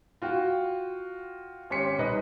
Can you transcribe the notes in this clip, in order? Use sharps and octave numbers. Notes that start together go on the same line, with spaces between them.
F4 F#4 G5
G#1 C#4 G4 C6 B6 C#7
C2 D#4 B4 D#5